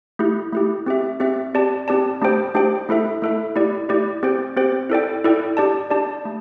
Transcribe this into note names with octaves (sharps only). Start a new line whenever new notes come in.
A3 E4 G4
A3 E4 G4
C4 G4 E5
C4 G4 E5
C4 G4 D5 A5
C4 G4 D5 A5
A3 D4 G4 C5 G5
A3 D4 G4 C5 G5
A3 E4 A4 E5
A3 E4 A4 E5
A3 E4 G4 D5
A3 E4 G4 D5
C4 G4 C5 G5
C4 G4 C5 G5
E4 A4 D5 G5
E4 A4 D5 G5
D4 G4 D5 A5
D4 G4 D5 A5
A3